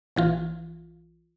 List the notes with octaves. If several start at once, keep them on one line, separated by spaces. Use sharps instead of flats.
A#1 E3 F4